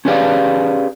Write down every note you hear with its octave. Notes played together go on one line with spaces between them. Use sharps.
C#4 G4 G#4 B4 D5 F5